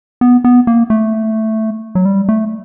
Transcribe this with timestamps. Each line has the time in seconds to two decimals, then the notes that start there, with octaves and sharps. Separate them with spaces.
0.21 B3
0.44 B3
0.67 A#3
0.90 A3
1.95 F#3
2.05 G3
2.29 A3